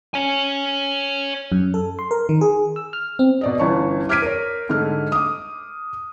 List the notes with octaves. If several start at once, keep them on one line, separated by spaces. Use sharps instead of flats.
C#5 G#5
F#2
A4
C6
A#4
D#3
G#4
E6
F6
C4
B2 D5 D#5
G1 E3 C#4 C#5 A5 C#6
D6 F6 G#6 B6 D7 D#7
A#4 C#5
G#2 D3 A3 F6
D6 D#6